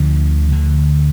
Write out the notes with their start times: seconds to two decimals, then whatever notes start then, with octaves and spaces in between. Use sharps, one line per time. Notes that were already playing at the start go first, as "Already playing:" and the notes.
Already playing: D2 D3 F3
0.51 D2 D3